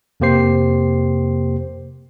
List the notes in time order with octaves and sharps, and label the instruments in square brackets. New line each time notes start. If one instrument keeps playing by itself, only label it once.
[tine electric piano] F2 C3 A#3 G4 C5 C7